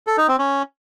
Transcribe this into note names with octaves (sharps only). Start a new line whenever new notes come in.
A4
D#4
C4
C#4